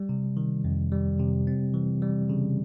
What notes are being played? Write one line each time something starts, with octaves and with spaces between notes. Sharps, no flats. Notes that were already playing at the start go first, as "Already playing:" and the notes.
Already playing: G3
C3
D#3
F2
G3
C3
C4
E3
G3
C#3